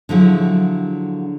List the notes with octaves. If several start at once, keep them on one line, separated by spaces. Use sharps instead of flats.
D3 F3 F#3 E4 G#4